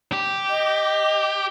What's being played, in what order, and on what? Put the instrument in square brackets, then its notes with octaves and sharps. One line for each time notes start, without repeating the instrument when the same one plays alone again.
[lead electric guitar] G4
[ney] D#5